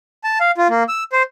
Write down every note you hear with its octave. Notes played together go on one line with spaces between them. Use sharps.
A5
F5
F4
A#3
E6
C5